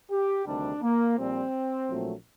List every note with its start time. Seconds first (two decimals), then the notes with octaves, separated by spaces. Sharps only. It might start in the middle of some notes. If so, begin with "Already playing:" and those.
0.11 G4
0.46 D2 C3 D#3 G3 D4
0.82 A#3
1.18 A#1 A#2 G3 C4
1.89 A#1 A#2 F#3 A3